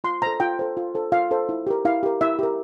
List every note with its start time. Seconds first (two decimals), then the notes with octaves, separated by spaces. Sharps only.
0.04 F4 C6
0.22 A4 C5 A#5
0.40 F4 G5
0.59 A4 C5
0.77 F4
0.95 A4 C5
1.12 F4 F5
1.31 A4 C5
1.49 E4
1.67 G4 A#4
1.85 E4 F5
2.03 G4 A#4
2.21 E4 E5
2.39 G4 A#4